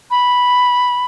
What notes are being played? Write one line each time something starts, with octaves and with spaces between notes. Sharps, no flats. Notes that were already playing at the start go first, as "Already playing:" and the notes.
B5